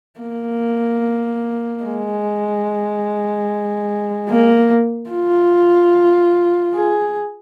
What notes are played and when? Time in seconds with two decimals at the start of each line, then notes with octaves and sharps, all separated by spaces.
0.20 A#3
1.84 G#3
4.29 A#3
5.10 F4
6.74 G#4